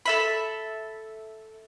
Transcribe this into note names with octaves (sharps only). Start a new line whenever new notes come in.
A4 E5 B5